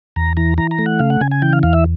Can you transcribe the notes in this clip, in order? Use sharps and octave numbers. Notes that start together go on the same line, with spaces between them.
E2 A#5
E3 A#5
E3 A#5
A#5
A3
F#5
C#3 F5
F#5
C#3 G#5
G#5
E3 G5
F5
E2 F5
E5